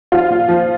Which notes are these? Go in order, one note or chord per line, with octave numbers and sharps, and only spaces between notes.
F3 F4
A#2
F3